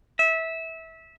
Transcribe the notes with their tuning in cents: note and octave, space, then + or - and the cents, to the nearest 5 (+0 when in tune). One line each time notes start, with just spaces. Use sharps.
E5 -20